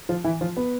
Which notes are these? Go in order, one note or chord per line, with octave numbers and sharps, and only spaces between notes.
F3 F4
E3 E4
F3 F4
B3 B4